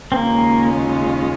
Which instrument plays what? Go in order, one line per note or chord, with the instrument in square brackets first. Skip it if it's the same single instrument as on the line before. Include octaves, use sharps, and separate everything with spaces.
[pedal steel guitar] C4
[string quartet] D#2 C#3 G#3 C#4 F4 [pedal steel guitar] A#3